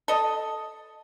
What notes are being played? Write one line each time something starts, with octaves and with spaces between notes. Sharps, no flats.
A4 D#5